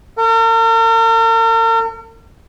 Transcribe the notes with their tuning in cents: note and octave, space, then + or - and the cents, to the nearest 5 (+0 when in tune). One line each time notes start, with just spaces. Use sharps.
A#4 -45